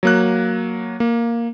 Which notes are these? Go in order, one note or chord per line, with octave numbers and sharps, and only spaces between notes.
F#3 A#3 F#6
A#3